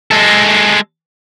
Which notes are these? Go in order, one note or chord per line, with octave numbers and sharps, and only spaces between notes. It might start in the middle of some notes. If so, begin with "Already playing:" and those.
G#3 A4